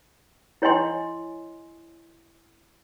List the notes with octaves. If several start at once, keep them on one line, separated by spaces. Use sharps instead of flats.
E4 C#5 D#5 G#5 C6